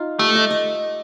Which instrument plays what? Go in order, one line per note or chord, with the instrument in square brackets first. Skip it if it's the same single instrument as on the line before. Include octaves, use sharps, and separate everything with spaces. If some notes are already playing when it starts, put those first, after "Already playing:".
Already playing: [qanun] D#4 F4
[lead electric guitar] A3 [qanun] G4
[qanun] D#5
D#5